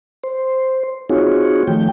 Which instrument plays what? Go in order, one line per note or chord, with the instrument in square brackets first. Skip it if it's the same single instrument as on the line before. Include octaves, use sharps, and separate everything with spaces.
[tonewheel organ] C5
C4 D#4 F4 F#4 G#4 C#5
D#3 F3 A3 G5